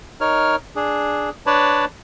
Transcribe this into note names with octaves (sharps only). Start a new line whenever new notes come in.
D#4 A#4 C#5 F6
D4 G#4
D4 B4 C#5 D5 A5